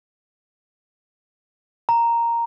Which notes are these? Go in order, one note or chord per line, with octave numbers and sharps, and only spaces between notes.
A#5